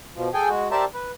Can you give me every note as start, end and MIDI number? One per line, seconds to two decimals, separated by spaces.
0.15 0.29 47
0.15 0.29 53
0.34 0.49 68
0.34 0.49 69
0.34 0.49 79
0.34 0.49 80
0.49 0.68 56
0.49 0.68 66
0.71 0.85 67
0.71 0.85 70
0.71 0.85 72
0.71 0.85 74
0.71 0.85 76
0.71 0.85 81
0.94 1.11 71